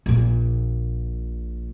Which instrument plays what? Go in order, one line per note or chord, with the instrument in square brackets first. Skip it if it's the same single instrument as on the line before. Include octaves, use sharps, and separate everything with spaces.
[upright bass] A#1 A#2